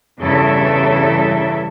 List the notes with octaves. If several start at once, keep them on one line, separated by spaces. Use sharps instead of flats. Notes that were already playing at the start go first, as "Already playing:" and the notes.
E2 G2 C#3 E3 A4 E5